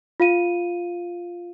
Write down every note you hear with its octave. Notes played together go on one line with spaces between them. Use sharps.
F4 F5 D#7